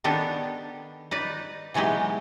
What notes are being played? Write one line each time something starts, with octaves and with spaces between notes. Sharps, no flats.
D#3 B3 D4 G4 A4
D#4 B4 D5
B2 E3 F#3 G#3 D#4 G4